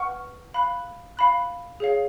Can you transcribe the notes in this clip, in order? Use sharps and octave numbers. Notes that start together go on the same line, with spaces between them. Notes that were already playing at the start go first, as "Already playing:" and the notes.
Already playing: B4 F#5 C#6 F6
F5 B5 F#6
F5 B5 F#6
G#4 C#5 F5